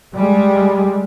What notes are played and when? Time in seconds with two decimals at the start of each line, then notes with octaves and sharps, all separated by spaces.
0.15 G3 G#3